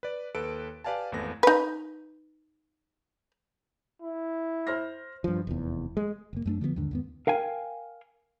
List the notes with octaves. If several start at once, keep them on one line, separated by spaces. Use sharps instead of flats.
B4 D5
D#2 A4 B4 D7
G4 B4 D5 F5 G#5 A5
G#1 E2 A3 B4 A#6
D#4 B4
E4
C5 F6 A#6
G2 F3
F1 E2
G#3
F#1 A#3
F#2 A3 D4
D3 F3 G3 B3
D#2 G#2 D3
D#2 G#2 B3
A#4 F5 G5 G#5